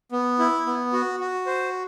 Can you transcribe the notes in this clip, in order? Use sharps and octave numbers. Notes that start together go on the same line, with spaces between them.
B3
E4
B3
F#4
F#4
C5